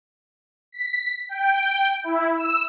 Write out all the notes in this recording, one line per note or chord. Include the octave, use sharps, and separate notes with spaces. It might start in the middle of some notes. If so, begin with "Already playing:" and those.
B6
G5
E4
E6